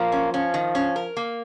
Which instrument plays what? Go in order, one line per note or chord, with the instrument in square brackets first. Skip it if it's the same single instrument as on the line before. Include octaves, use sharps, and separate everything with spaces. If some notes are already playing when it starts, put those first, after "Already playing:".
Already playing: [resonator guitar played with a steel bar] F3 [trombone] A#3
[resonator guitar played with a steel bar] C#4
[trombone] F3 [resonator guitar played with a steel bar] C#4
[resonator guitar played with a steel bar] D#3
C#4
A#4
A#3